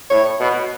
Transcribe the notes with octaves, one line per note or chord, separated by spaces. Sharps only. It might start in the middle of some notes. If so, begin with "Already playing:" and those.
A2 C#5
B2